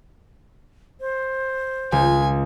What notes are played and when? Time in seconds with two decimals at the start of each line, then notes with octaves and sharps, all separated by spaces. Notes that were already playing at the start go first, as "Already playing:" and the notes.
1.01 C5
1.92 C#2 G#5